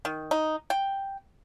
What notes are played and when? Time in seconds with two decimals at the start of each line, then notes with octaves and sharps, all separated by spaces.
0.05 D#3
0.31 D#4
0.70 G5